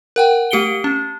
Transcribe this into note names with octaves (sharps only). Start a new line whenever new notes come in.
A#4 F#5 G5
A3 G4 C#7 D7 G7
C#4